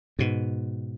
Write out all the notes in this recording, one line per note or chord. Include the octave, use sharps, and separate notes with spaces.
G#2 B2